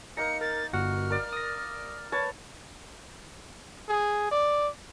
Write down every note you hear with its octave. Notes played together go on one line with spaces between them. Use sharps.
A#3 D#4 A#5 C#7
A#4 A6
G1 F#4 F#5 F6
A#4 D5
D#6 A#6
B4 C#5 A5
G#4
D5